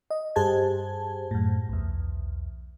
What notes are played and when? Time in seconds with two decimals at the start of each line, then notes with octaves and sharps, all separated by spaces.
0.10 D#5
0.36 G2 G4 G#4 C5 A5 G#6
1.31 F#2 A2
1.69 B1 E2